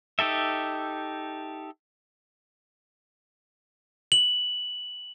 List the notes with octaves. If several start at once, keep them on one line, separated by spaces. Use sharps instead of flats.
D#4 G4 A4 E5
F#7